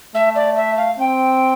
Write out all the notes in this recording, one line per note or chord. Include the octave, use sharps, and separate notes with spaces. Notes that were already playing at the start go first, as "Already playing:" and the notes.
A3 E5
D5
E5
F5
C4 G5